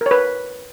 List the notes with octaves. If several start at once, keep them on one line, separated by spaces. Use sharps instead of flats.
A#4
C#5
B4